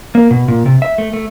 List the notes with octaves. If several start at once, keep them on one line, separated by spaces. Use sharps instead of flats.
A#3
B2
A#2
C3
E5
A3
A3